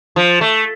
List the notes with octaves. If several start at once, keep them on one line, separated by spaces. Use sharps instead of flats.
F3
A3